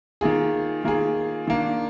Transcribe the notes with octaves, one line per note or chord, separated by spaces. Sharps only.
D#3 A#3 F4 G#4
D#3 A#3 F4 G#4
D#3 A#3 D4